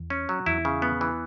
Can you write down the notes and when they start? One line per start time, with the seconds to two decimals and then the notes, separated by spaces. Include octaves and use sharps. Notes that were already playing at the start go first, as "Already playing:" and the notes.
Already playing: E2
0.10 C#4
0.29 F#3
0.46 E2 E4
0.65 C#3
0.82 B3
1.01 E3